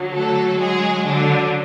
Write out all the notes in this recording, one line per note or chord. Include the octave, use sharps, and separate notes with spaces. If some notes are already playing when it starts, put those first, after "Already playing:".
Already playing: D3 F#3
A3 A4
G#3 G#4
D3 D4